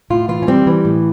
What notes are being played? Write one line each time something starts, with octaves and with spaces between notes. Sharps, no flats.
A2 F4
E3 F4
C#4
G3 C4
E3
A2